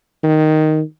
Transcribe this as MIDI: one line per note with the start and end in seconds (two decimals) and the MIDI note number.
0.23 0.81 51